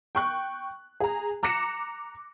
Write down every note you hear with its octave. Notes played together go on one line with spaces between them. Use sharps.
G5 C#6 F#6
G#4 A#5
A#5 D6 F#6 A#6 C#7 E7